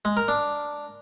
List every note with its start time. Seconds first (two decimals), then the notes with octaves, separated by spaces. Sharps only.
0.05 G#3
0.17 A#4
0.28 D4